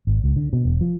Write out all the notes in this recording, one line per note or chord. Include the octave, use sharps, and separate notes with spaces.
G#1
C#2
D3
B2
E1
F3